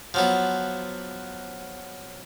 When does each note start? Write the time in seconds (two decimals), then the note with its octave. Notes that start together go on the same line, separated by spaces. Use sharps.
0.14 F3 F#3 B3